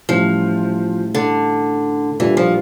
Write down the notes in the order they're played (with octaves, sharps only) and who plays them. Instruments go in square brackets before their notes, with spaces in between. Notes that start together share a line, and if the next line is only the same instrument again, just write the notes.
[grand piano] A2 E3 G3 C#4 E4 [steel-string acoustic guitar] F3
[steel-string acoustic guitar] D3
[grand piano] A#2 G3 D4 [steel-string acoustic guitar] E3
[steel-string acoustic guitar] F3